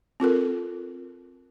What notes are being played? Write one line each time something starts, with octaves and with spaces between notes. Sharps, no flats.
C4 F4 A4 A#4